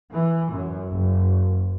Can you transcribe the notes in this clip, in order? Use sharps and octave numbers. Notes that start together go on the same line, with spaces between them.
E3
F#2
F#1